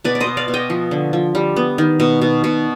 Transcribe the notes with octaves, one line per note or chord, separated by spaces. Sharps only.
B2 B4 D5
D5
C5 D#5
B2
D5 F5
B2
D#5 G5
F3
D3
F3
G3
B3
D#3
B2
B2
B2